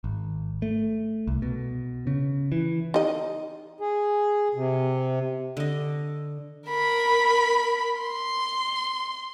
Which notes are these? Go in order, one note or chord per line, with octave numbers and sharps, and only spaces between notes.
G#1
A3
C2
B2
C#3
E3
D#4 D#5
G#4
C3
D3 D#5
A#4 B5
C6